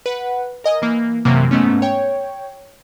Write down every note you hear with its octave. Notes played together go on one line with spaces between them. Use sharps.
B4 F#5
A#4 D#5 G#5 D#6
E3 A#3
F#2 C3 E3 F#3 A#3
G#2 A3 B3 C#4
C#5 G5